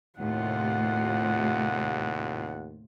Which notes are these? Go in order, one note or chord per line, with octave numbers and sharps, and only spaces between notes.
D#2 A2 C3 F4 F#5